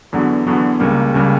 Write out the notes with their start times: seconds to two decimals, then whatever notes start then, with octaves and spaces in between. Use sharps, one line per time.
0.12 E2 D3 F#3 B3
0.47 E2 D3 F#3 B3
0.80 C#2 C#3 G3 A#3
1.14 C#2 C#3 G3 A#3